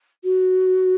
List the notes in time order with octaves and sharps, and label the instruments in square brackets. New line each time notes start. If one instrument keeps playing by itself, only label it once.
[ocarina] F#4